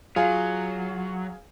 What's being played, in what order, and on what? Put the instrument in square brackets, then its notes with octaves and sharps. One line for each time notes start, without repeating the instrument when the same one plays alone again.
[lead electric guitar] F#3 [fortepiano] F4 [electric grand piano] G#4 F5 G#5